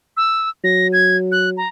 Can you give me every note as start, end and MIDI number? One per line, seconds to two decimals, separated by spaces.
0.17 0.49 88
0.64 1.64 54
0.64 0.88 94
0.93 1.17 92
1.32 1.50 90
1.57 1.68 82